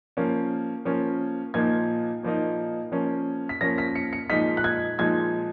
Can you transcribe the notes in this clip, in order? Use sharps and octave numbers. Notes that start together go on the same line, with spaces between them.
F3 A#3 C#4
F3 A#3 C#4
A#2 F3 A#3 D#4 G#6
A#2 F3 A#3 D#4
F3 A#3 C#4
B6
F3 A#3 C#4 A#6
B6
C#7
C#7
A#2 F3 G#3 D#4 B6
F#6
G#6
A#2 F3 G#3 D#4 G#6